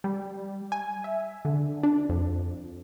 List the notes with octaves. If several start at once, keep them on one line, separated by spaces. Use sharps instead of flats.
G3
G#5
E5
D3
D4
F2